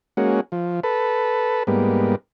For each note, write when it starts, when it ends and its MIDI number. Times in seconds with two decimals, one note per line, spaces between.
0.17 0.41 56
0.17 0.41 58
0.17 0.41 61
0.17 0.41 66
0.52 0.80 53
0.83 1.63 69
0.83 1.63 71
1.67 2.16 44
1.67 2.16 55
1.67 2.16 58
1.67 2.16 59